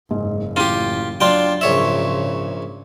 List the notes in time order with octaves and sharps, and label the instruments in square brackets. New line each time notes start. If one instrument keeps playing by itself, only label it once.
[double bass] F#1 [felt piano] G#2
[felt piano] A1 E4 D#7 [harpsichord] F4 G4
[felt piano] F#3 D5 C6 [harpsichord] D4 F4 G5
[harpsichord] A#1 C#5 E5 [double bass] G#2 C#3